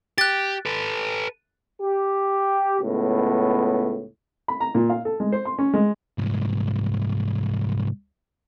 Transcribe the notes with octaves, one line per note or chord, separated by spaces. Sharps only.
G4 F#6 A6
A4 B4
G4
C#2 A2 B3
B5
A#5
A#2
F5
A4
G#3
C5
C6
C#4
G#3
C2 G#2